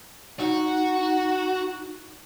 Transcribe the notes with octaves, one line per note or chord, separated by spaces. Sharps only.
D#4 F#4